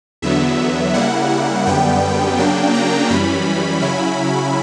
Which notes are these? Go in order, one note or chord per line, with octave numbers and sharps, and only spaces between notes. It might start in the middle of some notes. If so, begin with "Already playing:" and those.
E2 D3 F#3 B3 E5
C#3 G3 A#3 E4 F#5
F#2 D3 G3 B3 G5
C#3 F#3 A#3 D4
A#5
F#2 E3 G3 C#4 B5
C#3 F#3 C#4 E4 B5